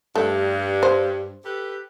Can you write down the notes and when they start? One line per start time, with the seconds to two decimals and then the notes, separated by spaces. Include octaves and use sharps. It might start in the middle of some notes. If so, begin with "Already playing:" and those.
0.15 G2 A3
0.83 C5
1.45 G4 A4 B4